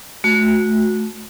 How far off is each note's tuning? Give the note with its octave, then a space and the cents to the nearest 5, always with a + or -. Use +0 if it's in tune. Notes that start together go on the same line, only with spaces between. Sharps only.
A3 -25 F#4 -20